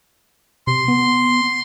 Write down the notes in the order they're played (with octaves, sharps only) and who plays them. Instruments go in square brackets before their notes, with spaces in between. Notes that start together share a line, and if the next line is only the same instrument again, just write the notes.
[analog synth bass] C3 [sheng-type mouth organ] C6
[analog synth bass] B3